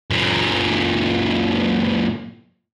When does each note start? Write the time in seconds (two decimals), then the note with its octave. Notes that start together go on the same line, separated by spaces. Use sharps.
0.10 F#2 A#2